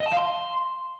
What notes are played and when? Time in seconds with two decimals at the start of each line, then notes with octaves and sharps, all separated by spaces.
0.01 D#5
0.06 A5
0.11 F5
0.17 C6